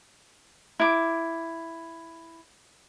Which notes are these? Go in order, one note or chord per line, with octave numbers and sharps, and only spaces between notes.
E4 D6